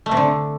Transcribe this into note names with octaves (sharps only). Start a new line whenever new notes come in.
A3
C3
D3